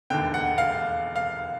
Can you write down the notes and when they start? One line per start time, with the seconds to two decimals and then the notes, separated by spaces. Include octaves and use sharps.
0.10 E1 D#2 D3 G5
0.34 F#5
0.58 F5
1.16 F5